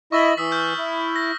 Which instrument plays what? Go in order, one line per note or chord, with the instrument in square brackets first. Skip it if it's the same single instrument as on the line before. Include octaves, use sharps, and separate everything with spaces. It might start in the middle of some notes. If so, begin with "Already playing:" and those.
[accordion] E4 D#5 E5 [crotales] C#6 A6 F#7
[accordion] E3 [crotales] D#6 E6 B6
[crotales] E6 F6 G6
[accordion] E4
[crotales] A#6